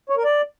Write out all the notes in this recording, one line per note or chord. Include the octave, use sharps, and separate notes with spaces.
C#5
A#4
D5